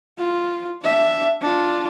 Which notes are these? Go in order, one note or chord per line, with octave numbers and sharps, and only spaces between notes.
F4
D4 E5
D4 F4